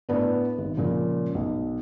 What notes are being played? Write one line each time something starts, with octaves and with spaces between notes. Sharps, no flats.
A2 B3 D4
G#1
A#2 C#3 F3 G#3
B1